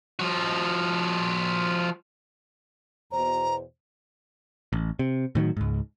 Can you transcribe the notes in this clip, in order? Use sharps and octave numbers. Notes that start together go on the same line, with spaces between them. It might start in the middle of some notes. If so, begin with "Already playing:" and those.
F3 F#4
E2 B2 C5 A#5
A1
C3
A2 D#3 F3 F#3
C#2 G#2